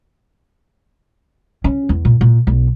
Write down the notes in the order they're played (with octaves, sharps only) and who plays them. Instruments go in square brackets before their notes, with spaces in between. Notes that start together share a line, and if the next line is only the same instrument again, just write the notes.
[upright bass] C#4
E2
A#2
A#2
B1